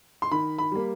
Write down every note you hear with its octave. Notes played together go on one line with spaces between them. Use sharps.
C6
D#3 B5
B5
G3 A#3